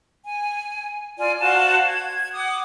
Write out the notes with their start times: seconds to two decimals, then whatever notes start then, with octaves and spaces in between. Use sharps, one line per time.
0.25 G#5
1.17 F4 D5 G#5
1.40 F#4 C5 F5 A5
1.85 G#6
2.33 F#5 D6 D#6